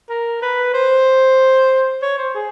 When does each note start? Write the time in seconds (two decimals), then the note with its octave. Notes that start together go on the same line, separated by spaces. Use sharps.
0.09 A#4
0.42 B4
0.73 C5
2.02 C#5
2.18 C5
2.34 G#4